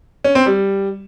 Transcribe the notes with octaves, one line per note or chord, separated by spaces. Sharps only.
C#4
C4
G3